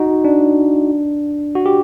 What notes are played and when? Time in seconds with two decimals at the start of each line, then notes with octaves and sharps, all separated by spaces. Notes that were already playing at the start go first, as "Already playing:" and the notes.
Already playing: D#4 F#4
0.24 D4
1.55 F#4
1.66 G4